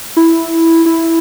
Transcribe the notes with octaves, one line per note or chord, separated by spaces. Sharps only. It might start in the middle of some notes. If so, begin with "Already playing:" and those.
E4
E4